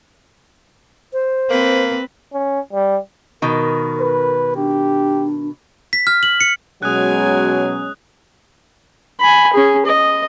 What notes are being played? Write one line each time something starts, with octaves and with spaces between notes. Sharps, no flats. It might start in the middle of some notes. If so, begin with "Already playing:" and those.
C5
A#3 C4 B4
C#4
G3
B2 D#3 A#4
B4
D4 G4
B6
F6
F#7
C#7
B2 F#3 G#3 C#4 G#5 D#6 F#6
G#5 B5
C#4 G#4
D#5